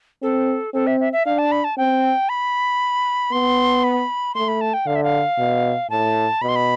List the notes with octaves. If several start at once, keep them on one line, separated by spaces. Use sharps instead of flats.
C4 A4
C4 A4
E5
E5
E5
D4 F5
A5
B5
A5
C4 G5
B5
B3 C6
B5
A3 C6
B5
A5
G5
D3 F5
E5
F5
B2
A2 A5
B2 B5
C6
B5